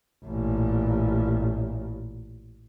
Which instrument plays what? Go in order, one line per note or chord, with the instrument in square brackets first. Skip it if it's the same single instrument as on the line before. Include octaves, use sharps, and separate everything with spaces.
[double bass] A1 A#2